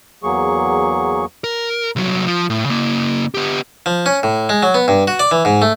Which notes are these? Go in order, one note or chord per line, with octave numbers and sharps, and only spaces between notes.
E2 F#3 A#3 G#4 C#6
A#4
C2 F#3
F3
A2
C#3 A#3
B3 G4
F3
C#4
A2
G#3
F#3
B3
G2
F#4
D5
E3
G#2
A3